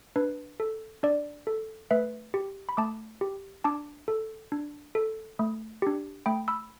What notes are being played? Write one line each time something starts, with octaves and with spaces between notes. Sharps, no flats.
D4 B4
A4
D4 D5
A4
A3 B4 E5
G4
B5
A3 A5 D6
G4
D4 A5 D6
A4
D4
A4
A3
D4 G4
A3 G5 B5
B5 E6